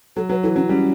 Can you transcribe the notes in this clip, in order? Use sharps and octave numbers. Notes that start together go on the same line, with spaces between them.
F#3 A4
F#3 B4
E3 A4
F#3 C#4
G3 C#4